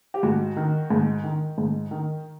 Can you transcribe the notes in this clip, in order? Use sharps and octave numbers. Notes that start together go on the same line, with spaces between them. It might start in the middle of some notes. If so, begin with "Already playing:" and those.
G4
G#2 F#4
D#3
G#2
D#3
G#2
D#3